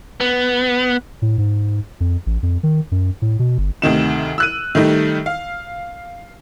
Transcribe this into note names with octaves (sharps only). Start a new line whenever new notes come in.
B3
A2
G#2
F2
A1
F2
D#3
F#2
A2
B2
G1
D2 C3 D#3 E7
E6 F#6 D#7
D#3 G3 A3 D#4
F5